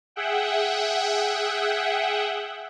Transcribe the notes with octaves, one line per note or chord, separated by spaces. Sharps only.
G#4 E5 F#5 G5